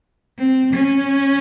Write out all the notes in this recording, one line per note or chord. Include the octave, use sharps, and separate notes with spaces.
C4
C#4